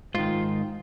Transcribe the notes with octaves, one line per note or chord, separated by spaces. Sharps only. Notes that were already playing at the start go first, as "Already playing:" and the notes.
G#2 D#3 F4